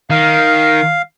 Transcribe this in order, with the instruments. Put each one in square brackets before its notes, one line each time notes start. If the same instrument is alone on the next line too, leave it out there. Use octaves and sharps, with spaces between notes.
[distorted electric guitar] D#3 [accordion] F5